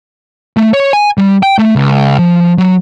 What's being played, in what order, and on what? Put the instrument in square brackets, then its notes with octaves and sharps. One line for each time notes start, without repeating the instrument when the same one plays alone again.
[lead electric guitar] A3
C#5
G#5
G3
G5
A3
C#2
F3
F#3